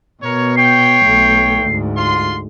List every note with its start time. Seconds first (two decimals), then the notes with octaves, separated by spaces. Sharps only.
0.23 B2 A#4 C#5
0.57 C#5 G5 C7
1.03 B1 A3
1.63 D2 G#2
1.97 F4 C6